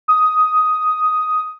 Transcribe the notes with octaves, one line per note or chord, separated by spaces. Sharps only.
D#6